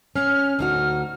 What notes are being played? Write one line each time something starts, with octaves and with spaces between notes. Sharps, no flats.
C#4 F6
D2 D#4 F#4 F6